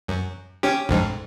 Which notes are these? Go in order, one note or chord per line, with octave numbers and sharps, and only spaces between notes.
F#2
C#4 G4
A#1 F2 G#2